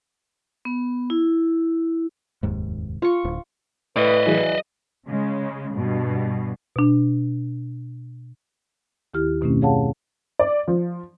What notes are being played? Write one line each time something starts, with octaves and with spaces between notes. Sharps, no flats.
B3
E4
F1 D#2 G#2
F4 C#6
D1
A2 B4 D5 D#5
E3 F#3 G#4
C#3 G#3
G2 B2
B2 D4
D#2 D#3 E4 G4 F6
F#2 B2 D#3 A3 C4 C#4
G#4 C#5 F5 F#5 A5
D5
F3